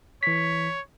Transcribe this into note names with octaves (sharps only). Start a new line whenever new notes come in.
E3 C#5 B6